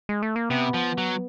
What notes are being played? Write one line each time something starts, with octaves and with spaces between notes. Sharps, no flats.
G#3
A3
A#3
C3 B3
F3
F#3